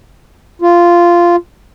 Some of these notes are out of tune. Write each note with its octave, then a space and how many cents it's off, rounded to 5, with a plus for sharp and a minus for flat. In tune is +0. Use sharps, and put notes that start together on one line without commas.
F4 -10